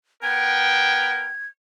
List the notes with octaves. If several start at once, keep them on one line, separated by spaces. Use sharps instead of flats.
B3 A#4 G5 G#6